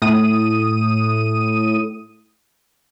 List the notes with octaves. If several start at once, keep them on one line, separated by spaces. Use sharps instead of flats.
A2 D#6 D#7